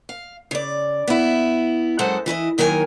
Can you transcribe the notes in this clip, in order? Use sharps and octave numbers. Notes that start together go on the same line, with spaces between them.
F5
C#3 D5
B3 E4
F#2 G#3 A4 C5 F#5
E3 E4 B4 D#5
D#2 D#3 F#3 A#4 C5 G#5